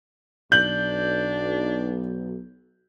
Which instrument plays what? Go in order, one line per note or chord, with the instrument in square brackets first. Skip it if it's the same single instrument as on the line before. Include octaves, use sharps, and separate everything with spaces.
[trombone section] B1 [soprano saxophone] D4 [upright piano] G6 F#7